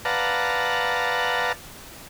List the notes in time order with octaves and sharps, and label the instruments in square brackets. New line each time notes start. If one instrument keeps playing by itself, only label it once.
[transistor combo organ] B4 D5 F5 F#5 A5 A#5